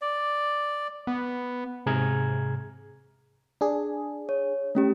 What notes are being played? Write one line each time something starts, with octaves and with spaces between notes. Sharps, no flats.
D5
B3
G#2 C3 G#4 A#5 F6 G#6
D4 G#4
C#5
A3 C#4 G4